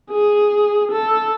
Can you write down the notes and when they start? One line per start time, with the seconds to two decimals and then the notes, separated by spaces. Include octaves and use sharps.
0.11 G#4
0.91 A4